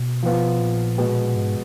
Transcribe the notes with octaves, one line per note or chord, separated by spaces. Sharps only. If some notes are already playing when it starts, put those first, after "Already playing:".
Already playing: B2
F3 B3 F4
A#2
B2 G#3 B3
G#2